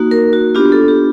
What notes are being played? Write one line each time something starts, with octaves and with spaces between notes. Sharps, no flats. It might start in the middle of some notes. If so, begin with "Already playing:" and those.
Already playing: A#3 D#4 F#4
A#4
F#4
B3 D4 F4 G4
A4
G4